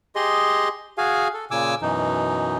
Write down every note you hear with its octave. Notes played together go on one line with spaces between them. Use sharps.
G4 G#4 D#5 C6
F#4 G#4 F5 G#5
A4
A#2 C#3 G#5 D6 E6
F#2 B2 E3 D#4